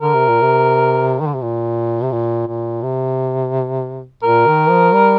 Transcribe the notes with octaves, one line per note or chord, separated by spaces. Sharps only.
D3 A#4
C3
A#2
C3
D#3
D3
C3
A#2
C3
A#2
A#2
C3
A#2 A#4
D#3
F3
G3